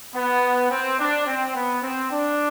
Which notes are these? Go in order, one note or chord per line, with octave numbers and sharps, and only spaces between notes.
B3
C4
D4
C4
B3
C4
D4